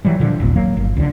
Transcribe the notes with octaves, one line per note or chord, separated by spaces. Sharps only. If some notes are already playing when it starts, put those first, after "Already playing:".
E3 F#3 G3
A#2 D3 F3
D#1 G#1 A#2 B3
F#3 A#3
G1
C#2 D3